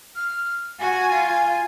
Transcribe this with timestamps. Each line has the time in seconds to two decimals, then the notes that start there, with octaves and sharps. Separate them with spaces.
0.16 F6
0.79 F#4 G#5
1.12 F4